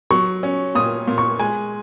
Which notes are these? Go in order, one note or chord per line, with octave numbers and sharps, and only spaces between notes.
F#3 C#6
C#4
A#2 D#6
A#2
C#6
G#3 G#5